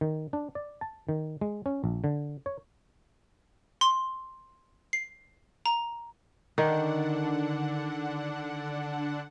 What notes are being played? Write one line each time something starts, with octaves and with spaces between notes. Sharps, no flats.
D#3
D4
D5
A5
D#3
G#3
C#4
A#1
D3
C#5
C6
C7
A#5
D3 D#3 D4 F#5